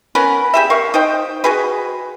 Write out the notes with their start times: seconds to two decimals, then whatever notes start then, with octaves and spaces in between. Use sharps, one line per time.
0.15 B3 C#4 A#4 B4
0.54 G4 G#4 E5
0.70 A#4 F5 C#6
0.94 D#4 C5 G5
1.44 F#4 G#4 B4